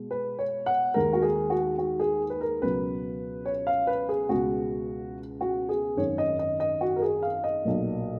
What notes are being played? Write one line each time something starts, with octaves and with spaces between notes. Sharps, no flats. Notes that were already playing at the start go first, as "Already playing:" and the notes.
Already playing: B2 G#3
B4
C#5
F#5
D#2 D#3 G#3 A#4
F#4
G#4
F#4
F#4
G#4
B4
A#4
C#2 B2 F#3 B4
C#5
F5
B4
G#4
C#2 B2 G#3 F#4
F#4
G#4
G#1 F#2 D#3 C#5
D#5
D#5
D#5
F#4
A#4
G#4
F5
D#5
B1 A#2 F#3